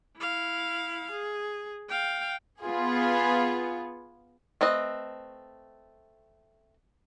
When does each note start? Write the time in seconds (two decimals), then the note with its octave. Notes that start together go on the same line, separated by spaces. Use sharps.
0.17 E4 F5
1.11 G#4
1.89 F5 G5
2.61 B3 F4 G#4
4.61 A3 C4 B4 D#5